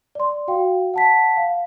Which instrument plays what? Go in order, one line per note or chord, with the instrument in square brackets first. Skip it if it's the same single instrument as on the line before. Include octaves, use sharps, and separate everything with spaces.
[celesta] D5 C6
F#4 F5 G5
F#5 A5 B6
F5